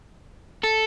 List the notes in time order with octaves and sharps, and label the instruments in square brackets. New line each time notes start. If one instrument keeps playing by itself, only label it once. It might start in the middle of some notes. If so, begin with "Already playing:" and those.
[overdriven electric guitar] A4